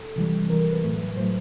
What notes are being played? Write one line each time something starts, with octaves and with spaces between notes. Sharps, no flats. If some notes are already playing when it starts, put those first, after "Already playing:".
Already playing: A4
C3 E3 G3
C3 E3 G3 A#4
A#4
B4
A2 F#3 A3
A2 F#3 A3 C5